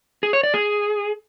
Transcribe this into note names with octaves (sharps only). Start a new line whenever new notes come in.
G#4
C#5
D5
G#4